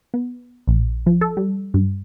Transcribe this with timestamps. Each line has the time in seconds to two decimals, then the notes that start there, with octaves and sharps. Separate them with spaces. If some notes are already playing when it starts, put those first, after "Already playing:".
0.14 B3
0.67 A#1
1.06 F3
1.21 A4
1.37 G3
1.74 G2